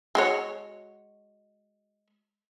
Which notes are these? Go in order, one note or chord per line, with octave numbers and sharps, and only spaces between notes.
G#3 F#4 C#5